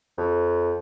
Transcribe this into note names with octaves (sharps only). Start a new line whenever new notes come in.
F2